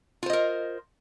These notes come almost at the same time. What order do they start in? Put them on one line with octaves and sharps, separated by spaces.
F4 C5 D#5 A#4